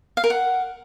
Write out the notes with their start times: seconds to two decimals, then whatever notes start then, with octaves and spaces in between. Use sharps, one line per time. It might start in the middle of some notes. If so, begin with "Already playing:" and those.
0.17 F5
0.24 A#4
0.30 F#5